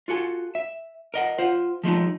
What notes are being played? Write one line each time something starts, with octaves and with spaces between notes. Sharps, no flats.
F4 F#4 A4 G#5
E5
A#4 D#5 F#5
F4 C5 F#5
F3 G#3 A3 D#4